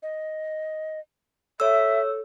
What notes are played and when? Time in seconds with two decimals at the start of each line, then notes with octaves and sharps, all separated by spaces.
0.03 D#5
1.60 A4 C#5 E5 E6